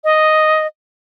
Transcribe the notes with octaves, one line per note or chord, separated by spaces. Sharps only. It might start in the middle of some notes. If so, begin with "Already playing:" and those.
D#5